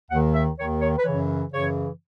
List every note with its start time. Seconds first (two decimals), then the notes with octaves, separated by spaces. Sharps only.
0.11 D#2 D#3 F#5
0.34 E5
0.58 D#2 D#3 C#5
0.81 C#5
0.97 B4
1.04 F#2 C#3 E3 C#5
1.51 F#2 C#3 E3 C#5